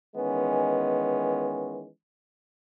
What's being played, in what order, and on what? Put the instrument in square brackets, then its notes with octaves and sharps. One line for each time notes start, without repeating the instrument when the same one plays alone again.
[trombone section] D#3 E3 G#3 B3 C#4